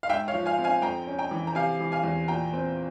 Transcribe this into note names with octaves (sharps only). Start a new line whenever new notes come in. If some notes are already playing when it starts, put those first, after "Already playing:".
F5
G#2 E5 G5
C#5 F5
F3
F5 G#5
C4
F5 G#5
F2 G5 A#5
C#4
G5 A#5
E3
A#5
C3 F5 G#5
E3
F5 G#5
E2
A#2 G5 A#5
C4